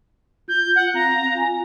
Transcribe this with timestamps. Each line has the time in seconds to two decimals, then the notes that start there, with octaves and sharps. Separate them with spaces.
0.48 F4 G6
0.75 F#5
0.94 C4 F5 A#5
1.35 F4 G#5